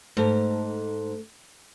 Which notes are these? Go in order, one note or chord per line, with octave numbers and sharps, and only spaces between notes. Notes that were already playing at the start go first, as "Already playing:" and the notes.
G#2 A3 A4